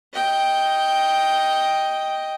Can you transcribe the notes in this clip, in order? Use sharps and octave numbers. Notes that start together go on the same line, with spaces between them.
D#5 G5